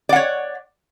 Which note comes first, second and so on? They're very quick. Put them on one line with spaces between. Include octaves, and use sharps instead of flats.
D5 F#5 C#5